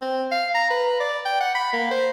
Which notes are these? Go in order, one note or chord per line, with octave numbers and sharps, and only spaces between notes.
C4
F5
A#5
B4
D5
G5
F#5
B5
A#3
C5